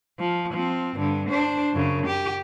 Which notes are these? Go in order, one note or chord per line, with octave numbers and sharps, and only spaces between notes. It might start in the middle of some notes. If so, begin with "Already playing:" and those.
F3
F3 C4
G2 D3
D4 C5
F#2 C#3
G4